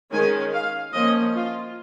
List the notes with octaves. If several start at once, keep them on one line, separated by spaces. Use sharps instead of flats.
D#3 G#3 C#4 G#5
F5
F3 A#3 C#4 D#5
F4